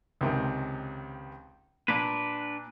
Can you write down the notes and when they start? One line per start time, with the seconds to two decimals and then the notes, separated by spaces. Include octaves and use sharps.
0.21 C#2 C3 D#3
1.88 A#2 D4 B4